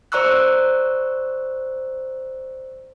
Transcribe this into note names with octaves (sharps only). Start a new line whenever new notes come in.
C5 D5 A#5 C#6 E6 F#6